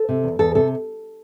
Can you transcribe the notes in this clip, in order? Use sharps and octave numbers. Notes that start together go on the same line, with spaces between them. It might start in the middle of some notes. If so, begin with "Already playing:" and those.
Already playing: A4
C3
E2
E2 A4
C3 A4